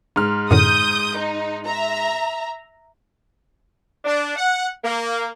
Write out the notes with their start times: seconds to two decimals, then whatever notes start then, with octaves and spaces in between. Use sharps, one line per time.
0.16 G#2 F6
0.51 F#2 A2 D3 D#6 G6
1.18 D#4
1.66 E5 A#5
4.05 D4
4.36 F#5
4.84 A#3